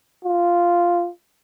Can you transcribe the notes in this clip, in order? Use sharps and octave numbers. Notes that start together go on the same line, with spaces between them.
F4